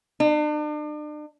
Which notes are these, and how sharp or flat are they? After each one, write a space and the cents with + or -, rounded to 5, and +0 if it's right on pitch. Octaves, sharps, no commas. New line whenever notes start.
D4 +40